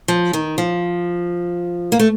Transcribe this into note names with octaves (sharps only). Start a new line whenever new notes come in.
F3
D#3
F3
A#3
A3